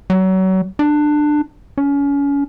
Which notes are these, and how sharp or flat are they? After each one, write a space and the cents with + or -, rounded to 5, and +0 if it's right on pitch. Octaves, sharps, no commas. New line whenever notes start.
F#3 +30
D4 +20
C#4 +30